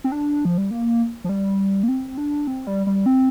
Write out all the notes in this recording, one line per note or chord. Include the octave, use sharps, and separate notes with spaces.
C4
D4
F3
G3
A#3
F3
G3
A#3
C4
D4
C4
G3
G3
C4